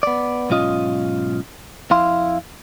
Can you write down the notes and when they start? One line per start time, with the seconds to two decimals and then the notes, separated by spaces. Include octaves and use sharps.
0.03 B3 D5
0.50 B1 G#2 C#4 F4 D#5
1.91 F2 E4 F5 C6